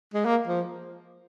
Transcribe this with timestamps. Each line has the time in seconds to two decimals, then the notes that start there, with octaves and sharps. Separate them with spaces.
0.14 G#3
0.25 A#3
0.47 F3